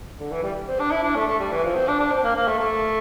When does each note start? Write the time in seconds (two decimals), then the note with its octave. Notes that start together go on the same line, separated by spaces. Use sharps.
0.19 D3
0.32 E3
0.43 G3
0.68 C4
0.80 D4
0.92 E4
1.04 D4
1.15 A3
1.27 A3
1.40 G3
1.52 E3
1.64 F3
1.75 C4
1.88 D4
2.00 D4
2.12 C4
2.24 A#3
2.36 A#3
2.48 A3
2.59 A3